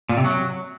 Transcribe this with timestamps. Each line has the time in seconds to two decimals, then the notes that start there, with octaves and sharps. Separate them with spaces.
0.09 A#2
0.17 C3
0.25 F#3